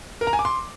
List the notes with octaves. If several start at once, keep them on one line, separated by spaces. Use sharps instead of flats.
A#4
A#5
G#5
D6
C6